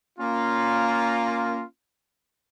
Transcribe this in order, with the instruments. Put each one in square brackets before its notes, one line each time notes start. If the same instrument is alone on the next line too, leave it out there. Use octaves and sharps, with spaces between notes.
[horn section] A#3 C#4 F4